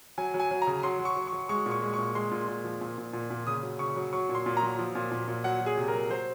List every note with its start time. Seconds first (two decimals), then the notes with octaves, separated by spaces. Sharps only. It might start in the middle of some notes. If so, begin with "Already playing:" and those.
0.18 F#3 G#5
0.34 F#3
0.39 G#5
0.51 F#3
0.62 A#5
0.67 C#3
0.83 F#3 C6
0.99 F#3
1.05 C#6
1.16 F#3
1.27 C#6
1.33 F#3
1.49 G#3 C#6
1.66 A#2
1.72 C#6
1.82 G#3
1.94 A#2 C#6
2.15 G#3 C6
2.31 A#2
2.48 A#2
2.64 F3
2.81 A#2
2.98 A#2
3.13 A#2
3.30 A#2
3.47 C#3 D#6
3.63 F#3
3.79 C#3 C#6
3.96 F#3
4.13 F#3 C#6
4.29 A#2
4.35 C6
4.46 A#2
4.57 A#5
4.63 F#3
4.79 F3
4.95 A#2
5.11 A#2
5.28 A#2
5.44 F#3 F#5
5.61 F#3
5.66 G#4
5.77 C3
5.88 A#4
5.94 F#3
6.10 F#3 C5